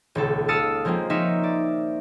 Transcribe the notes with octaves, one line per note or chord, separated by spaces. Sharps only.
D#1 C#2 A4
F5 A5 D#6 E6 A6 C#7
F3 G#3 A#3 C4 F4
C4 D#4 A#4 C#5 E5
D5